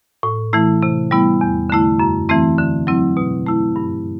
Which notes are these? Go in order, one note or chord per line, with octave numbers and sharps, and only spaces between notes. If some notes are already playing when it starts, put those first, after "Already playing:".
A2
E3 A3 E4
C3
G3 B3 E4
E2
D3 A3 E4
F#2
E3 A3 C4 E4
D3
F#3 C4 E4
B2
A3 E4
G2